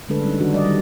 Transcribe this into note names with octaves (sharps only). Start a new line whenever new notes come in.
D3 G#3 A3 D4 A4 B4
G3 C#4 D#4
D#3 D4 F#4
G3 D5 D#5
D#3 G3 D#4